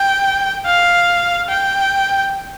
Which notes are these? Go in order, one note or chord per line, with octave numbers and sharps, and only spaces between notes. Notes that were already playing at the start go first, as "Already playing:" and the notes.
Already playing: G5
F5
G5